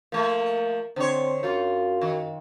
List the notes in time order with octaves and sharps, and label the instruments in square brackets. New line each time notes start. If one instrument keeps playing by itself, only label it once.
[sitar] F3 A3 [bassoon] A#3
[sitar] D3 C#5 [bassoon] C4
[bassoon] F#2 [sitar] F#3 F4
[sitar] D#3